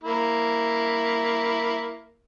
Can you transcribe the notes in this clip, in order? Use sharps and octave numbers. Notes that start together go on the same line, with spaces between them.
A#3 E4